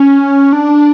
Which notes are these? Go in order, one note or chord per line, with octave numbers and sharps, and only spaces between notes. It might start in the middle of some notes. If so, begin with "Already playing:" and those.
Already playing: C#4
D4